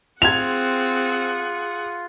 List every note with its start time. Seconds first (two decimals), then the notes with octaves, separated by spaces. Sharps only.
0.22 C4 F4 G#4 F#5 G#6 F7